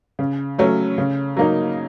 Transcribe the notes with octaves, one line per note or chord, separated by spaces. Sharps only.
C#3
F#3 A3 C#4
C#3
F#3 A#3 D#4